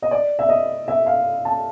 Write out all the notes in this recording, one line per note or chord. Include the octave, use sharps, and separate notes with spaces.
D#5
D5
E5
D#5
E5
F5
A5